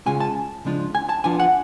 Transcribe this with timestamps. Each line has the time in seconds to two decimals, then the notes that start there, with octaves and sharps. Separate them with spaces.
0.06 C#3 G#3 C#4 F4 G#5
0.20 A5
0.65 C#3 F3 G#3 D4 F4
0.95 G#5
1.09 A5
1.24 F3 B3 D4 F4 G#5
1.40 F#5